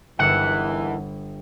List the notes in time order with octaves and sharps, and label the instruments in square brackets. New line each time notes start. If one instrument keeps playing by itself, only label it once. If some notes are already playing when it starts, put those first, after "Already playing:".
[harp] G1 E6 [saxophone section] E2 D#3 E3 [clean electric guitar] F#5